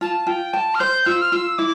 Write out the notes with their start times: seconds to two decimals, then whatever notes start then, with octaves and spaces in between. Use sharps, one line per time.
0.01 F4 A5
0.27 F4 G5
0.53 G5 A5
0.74 F6
0.79 C5 G6
1.06 F4 E6
1.21 F6
1.32 F4 E6
1.58 E4 D6